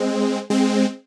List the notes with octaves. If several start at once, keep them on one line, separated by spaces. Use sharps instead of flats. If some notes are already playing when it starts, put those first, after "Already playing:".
Already playing: G#3 C4
G#3 C4